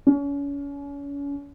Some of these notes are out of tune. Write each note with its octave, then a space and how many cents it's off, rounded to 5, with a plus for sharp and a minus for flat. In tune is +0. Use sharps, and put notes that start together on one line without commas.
C#4 +35